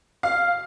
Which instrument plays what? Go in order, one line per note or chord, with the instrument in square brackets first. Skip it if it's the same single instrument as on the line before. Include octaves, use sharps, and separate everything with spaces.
[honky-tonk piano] F5